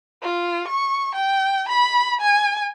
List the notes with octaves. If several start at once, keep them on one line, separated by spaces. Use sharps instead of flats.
F4
C#6
G5
B5
G#5